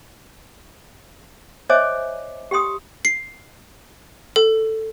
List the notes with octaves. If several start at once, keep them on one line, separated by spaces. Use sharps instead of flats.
C5 C#5 D#5 E5 G#5 D6
G4 G5 C6 D#6
C7
A4